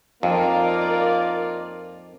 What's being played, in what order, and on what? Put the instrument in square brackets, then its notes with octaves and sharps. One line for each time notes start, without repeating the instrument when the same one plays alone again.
[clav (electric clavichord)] F2 [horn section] A#3 D#4 F4 [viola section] A#4 D5